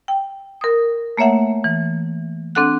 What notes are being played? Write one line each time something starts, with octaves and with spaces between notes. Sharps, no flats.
G5
A#4 D#6
A3 A#3 C#5 E5 F#5
E3
C4 D4 A4 F#5 F#6